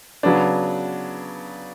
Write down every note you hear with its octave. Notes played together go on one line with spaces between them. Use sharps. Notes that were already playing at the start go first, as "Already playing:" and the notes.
C#3 F#3 B3 D4